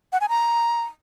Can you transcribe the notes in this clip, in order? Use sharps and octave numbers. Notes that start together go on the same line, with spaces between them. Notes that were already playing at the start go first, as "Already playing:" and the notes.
F#5
G#5
A#5